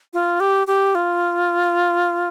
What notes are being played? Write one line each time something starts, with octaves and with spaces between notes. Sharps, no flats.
F4
G4
G4
F4